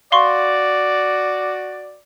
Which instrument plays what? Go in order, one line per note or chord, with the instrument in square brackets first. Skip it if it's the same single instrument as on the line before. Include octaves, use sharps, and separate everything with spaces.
[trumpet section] F#4 D5 [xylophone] F5 C6 C#6